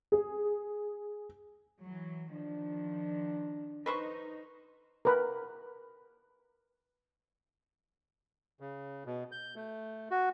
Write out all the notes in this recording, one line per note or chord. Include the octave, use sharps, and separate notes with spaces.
G#4
E3 F#3
D#3 F3 D4
D#4 B4 C5 C#6
A#4 B4
C#3
B2
G6
A3
F#4